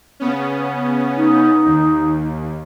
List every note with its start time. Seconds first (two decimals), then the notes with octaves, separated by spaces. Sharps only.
0.20 C#3 B3 C#4
1.16 D#4
1.66 D#2